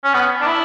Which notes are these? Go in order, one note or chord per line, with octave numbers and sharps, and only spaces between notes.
C#4
B3
D4
E4